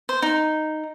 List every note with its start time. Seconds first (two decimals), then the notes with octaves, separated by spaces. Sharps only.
0.09 C5
0.22 D#4